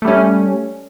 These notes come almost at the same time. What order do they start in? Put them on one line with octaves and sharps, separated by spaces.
A3 G3 C#4